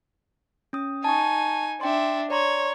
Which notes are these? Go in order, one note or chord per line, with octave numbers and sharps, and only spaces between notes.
C#4 D#6
D#4 G#5 A5 C#6
D4 E5 G5 C6
C#5 D5 A#5 C6